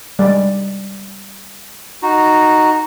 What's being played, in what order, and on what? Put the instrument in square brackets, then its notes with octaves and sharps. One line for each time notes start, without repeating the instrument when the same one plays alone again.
[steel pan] G3 G#3 D5
[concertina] D#4 F#4